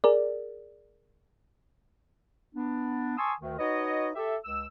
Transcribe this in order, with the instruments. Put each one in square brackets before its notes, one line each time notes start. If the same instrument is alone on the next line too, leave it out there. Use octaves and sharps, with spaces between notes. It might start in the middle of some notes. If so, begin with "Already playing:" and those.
[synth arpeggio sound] G#4 A#4 D5
[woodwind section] B3 D4
G#5 A5 C6 C#6 D#6 E6
D2 D#3
D#4 F#4 B4 C#5 D#5
G4 A4 E5
C#2 E6